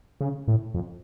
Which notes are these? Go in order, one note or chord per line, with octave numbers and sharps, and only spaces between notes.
C#3
A2
F2